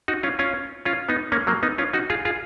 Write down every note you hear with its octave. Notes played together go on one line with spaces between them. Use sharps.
D#4 F#4
C#4 F4
C#4 F4
C#4 F4
B3 D#4
A#3 C#4
F#3 A#3
B3 D#4
C#4 F4
D#4 F#4
F4 G#4
F4 G#4